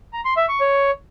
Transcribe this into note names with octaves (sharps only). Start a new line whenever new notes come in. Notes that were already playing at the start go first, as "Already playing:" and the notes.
A#5
C6
E5
C#6
C#5